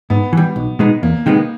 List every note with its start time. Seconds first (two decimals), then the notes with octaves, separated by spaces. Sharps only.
0.10 G#2 B3
0.33 E3 G3
0.56 B1
0.79 B2 G#3 B3 D#4
1.03 E2 A#3
1.26 C3 D#3 G#3 B3